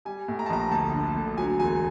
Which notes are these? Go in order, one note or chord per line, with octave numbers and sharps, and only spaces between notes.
G3 G#5
A2
A#5
A5
A#1 A#5
D2 A5
D3
D2
F#3 G#5
E1 G#5